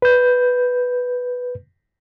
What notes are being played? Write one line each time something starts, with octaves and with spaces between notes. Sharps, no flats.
B4 G6